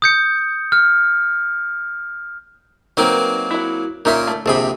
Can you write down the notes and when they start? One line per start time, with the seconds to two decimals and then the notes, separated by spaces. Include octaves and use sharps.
0.02 D#6 G6 C#7
0.72 F6
2.97 F#3 A#3 C4 D#4 A#4 B4
3.51 E4 F#4
4.05 A#2 C#4 D#4 A#4 E5 C6
4.27 A3
4.46 A#1 C3 C4 G#4 A4 B5